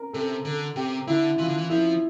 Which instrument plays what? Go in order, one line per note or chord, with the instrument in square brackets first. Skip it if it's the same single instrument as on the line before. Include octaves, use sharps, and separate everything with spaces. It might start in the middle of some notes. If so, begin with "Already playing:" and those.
Already playing: [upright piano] A#4
[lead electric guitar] C3 [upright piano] A4
[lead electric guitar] D3 [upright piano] A4
[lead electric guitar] C3 [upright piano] G4
[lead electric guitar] D3 [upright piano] E4
[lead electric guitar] E3 [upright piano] F4
[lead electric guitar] D3
E3
[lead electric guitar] F3 [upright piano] E4